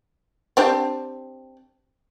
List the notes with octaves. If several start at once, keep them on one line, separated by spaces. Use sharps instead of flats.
C4 D4 G4